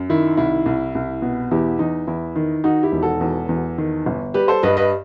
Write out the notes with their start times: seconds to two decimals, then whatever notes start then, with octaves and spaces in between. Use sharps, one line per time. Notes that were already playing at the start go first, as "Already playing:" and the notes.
Already playing: F#2
0.10 D#3 E4
0.37 C2 E4
0.66 C2
0.95 C2
1.22 B2
1.51 E2 E4 G4
1.79 E2 D#4
2.07 E2 E4
2.36 D#3
2.64 D#3 D#4 F#4
2.83 E4 G4
2.92 E1
3.02 F#4 A4
3.21 E2
3.49 E2
3.78 D#3
4.06 G1
4.34 G3 G4 B4
4.48 A4 C5
4.63 G2 B4 D#5
4.77 B4 D#5